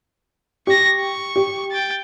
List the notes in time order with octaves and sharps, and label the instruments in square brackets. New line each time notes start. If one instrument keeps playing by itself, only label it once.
[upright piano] G4 [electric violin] C#6 A#6
[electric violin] C#6
[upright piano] G4
[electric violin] G5 A6